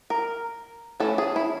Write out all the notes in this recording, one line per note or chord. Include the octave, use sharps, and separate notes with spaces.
A#4
E3 A3 C#4 A4
G#4
E4